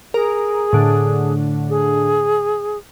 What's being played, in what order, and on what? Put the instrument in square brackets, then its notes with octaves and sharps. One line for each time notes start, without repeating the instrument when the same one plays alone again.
[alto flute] G#4 [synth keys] A#4
[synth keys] A2 D3
[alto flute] G#4